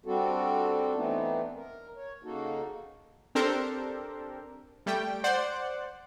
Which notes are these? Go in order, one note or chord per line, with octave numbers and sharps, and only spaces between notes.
G3 C4 D4 F#4 A4
E3 A3 B3 C4 D4 D#4
A#4
C#5
C#3 A#3 D#4 F#4 A4
C4 D4 G4 A4 A#4 C5
G3 A3 G5
C5 D5 F#5